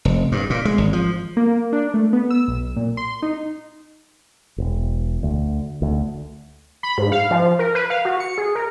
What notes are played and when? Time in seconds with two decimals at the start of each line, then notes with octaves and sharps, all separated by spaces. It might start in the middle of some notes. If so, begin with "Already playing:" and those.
0.05 F1
0.32 G2
0.50 A#2
0.65 G#3
0.78 G#1
0.93 F3
1.37 A#3
1.73 D4
1.94 A3
2.13 B3
2.30 E6
2.48 B1
2.76 A#2
2.97 C6
3.22 D#4
4.58 E1
5.23 D2
5.82 D2
6.83 B5
6.98 G#2
7.12 F5
7.31 F3
7.59 A#4
7.75 B4
7.90 F5
8.05 F#4
8.20 C#7
8.38 G#4
8.55 A#4